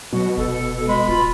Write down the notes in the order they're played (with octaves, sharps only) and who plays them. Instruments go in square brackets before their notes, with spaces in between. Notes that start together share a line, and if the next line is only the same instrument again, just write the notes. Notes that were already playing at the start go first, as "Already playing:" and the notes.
[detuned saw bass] B2 [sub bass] F#3 [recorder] F#4
[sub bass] F1 [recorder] A4
[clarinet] G#3 [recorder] B5
[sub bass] D1 [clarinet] F4